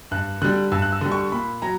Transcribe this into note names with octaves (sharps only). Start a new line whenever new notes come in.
G2 F#6
D3 G3 F#6
G2 E6
F#6
E6
D3 G3
C#6
A#2 B5
F#3 A#5